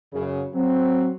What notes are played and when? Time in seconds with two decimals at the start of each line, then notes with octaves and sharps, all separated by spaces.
0.13 F#2 C#3
0.54 F#3 C4